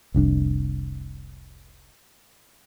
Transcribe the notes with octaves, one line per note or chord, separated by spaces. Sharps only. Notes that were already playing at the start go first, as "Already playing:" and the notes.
F1 C2 D4